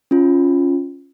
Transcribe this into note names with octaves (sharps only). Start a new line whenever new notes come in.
C#4 F4